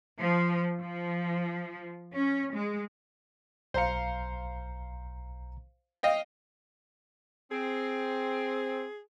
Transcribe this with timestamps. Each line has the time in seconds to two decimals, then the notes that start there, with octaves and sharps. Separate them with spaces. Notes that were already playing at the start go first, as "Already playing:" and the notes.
0.20 F3
0.81 F3
2.12 C#4
2.52 G#3
3.74 B1 C5 F5 A#5 C#7
6.03 D#5 F5 G5
7.51 C4 G#4